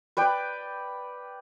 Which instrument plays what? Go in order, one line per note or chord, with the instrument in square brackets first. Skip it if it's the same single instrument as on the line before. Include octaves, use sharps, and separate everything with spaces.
[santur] B4 D5 G5